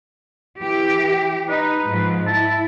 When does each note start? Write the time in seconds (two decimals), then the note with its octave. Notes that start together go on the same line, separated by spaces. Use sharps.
0.59 E3 G4
1.49 D#4 B4
1.88 G#2 F3
2.27 E4 A5